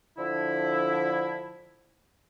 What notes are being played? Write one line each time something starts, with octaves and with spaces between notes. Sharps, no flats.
D3 F3 E4